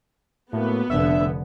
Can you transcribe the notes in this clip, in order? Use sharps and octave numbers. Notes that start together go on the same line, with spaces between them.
A2 A#3 B3 F#4
F1 D3 D4 E5